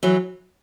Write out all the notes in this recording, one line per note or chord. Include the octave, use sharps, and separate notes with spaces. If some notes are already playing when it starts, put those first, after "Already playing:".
E3 F#3